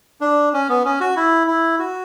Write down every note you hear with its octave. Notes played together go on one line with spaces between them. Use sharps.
D4
C#4
B3
C#4
F#4
E4
E4
F#4